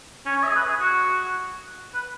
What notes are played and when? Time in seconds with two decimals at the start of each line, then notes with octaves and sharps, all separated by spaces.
0.26 C#4
0.36 C#5
0.43 E5
0.49 G#4
0.56 B4
0.68 G#4
0.80 F#4
1.94 B4